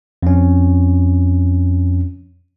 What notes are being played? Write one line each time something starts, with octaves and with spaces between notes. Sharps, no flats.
F2 C#4